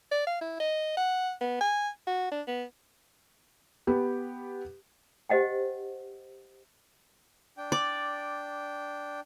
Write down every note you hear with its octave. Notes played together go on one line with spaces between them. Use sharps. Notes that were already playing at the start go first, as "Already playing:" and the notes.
D5
F5
E4
D#5
F#5
B3
G#5
F#4
D4
B3
B3 G4
G4 C5 D#5 F#5 G5
D4 G5
D5